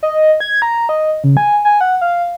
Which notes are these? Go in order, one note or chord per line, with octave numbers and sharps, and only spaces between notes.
D#5
G#6
A#5
D#5
C#3
G#5
G#5
F#5
F5